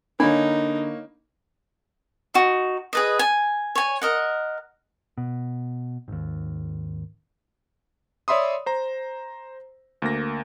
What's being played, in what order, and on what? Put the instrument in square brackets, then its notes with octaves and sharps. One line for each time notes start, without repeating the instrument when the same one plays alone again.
[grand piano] D3 B5 [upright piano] A#3 C#5 [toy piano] D4 [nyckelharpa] D#4
[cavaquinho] D#4 F#4
G#4 B4 D#5
G#5
C#5 G#5
A#4 D#5 F#5
[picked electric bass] B2
G#1 D#2
[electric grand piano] C#5 D5 E5 B5 C6 D#6
C5 A#5
D2 A#3 A#6